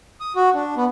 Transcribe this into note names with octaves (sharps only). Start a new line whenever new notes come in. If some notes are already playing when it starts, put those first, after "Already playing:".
D#6
F#4
D4
B3